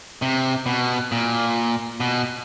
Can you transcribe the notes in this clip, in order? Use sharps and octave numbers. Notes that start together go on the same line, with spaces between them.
C3
B2
A#2
B2